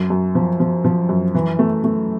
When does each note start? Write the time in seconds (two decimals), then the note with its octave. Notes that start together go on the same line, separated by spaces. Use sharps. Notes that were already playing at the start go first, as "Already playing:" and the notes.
Already playing: F#2
0.10 F#2
0.35 F3
0.60 F3
0.85 F3
1.09 F#2
1.34 E3
1.59 A3
1.84 A3